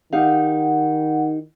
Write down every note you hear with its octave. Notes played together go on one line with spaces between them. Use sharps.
D#3 D#4 G4 F5 F#5